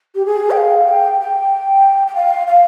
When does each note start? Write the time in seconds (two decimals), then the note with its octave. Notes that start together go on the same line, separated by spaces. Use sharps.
0.15 G4
0.26 G#4
0.51 G5
0.57 F5
0.89 G5
1.21 G5
2.07 G5
2.16 F5
2.47 F5